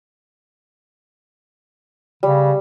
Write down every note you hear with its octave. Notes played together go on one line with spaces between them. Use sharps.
C#3 G3